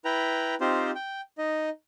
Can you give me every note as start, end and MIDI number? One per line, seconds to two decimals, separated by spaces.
0.05 0.55 64
0.05 0.55 71
0.05 0.55 79
0.05 0.55 82
0.61 0.91 60
0.61 0.91 63
0.61 0.91 65
0.61 0.91 67
0.61 0.91 72
0.95 1.21 79
1.38 1.69 63
1.38 1.69 75